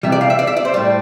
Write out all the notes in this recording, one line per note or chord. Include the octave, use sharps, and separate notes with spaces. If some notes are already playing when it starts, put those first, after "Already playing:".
C3 E3 G3 E5
D5
F5
E5
D5
E5
D5
C5
A2 G3 D5